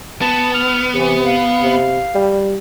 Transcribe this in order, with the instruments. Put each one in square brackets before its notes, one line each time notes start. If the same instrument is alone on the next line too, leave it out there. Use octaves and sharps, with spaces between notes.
[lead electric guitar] B3 [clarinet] A5
[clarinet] F6
[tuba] C3 [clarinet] E3
[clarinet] F5
[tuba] C3
G3